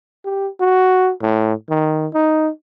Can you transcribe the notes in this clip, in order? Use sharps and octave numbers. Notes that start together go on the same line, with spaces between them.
G4
F#4
A2
D#3
D#4